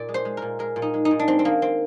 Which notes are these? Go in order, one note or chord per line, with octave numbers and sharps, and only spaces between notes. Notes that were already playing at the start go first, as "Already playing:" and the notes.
Already playing: A#2 D5
G#3
C5
G#3
A#2 A#4
G#3 A#4
A#2
D#4
G#3
D#4
A#2
D4
G#3 C4
C4
D#3 A#3
C4